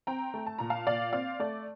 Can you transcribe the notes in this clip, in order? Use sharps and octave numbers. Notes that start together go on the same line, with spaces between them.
C4 G5 A#5
A3
A5
A#2 A#5
F5 A5
A#2 D5 F5
C4 D5 F5
A3 D5